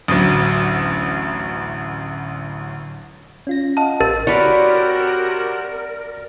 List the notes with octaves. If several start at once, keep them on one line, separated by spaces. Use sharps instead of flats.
A1 D2 F#3
C#4 F4 A#6
D#5 F5 F#5 A5
A1 A#4 A6
C3 G3 F#4 A#4 B4 C#5 D5